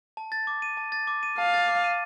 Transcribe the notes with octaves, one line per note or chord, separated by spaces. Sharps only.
A5
A6
D6
D#7
A5
A6
D6
D#7
F5 A5
A6
D6
D#7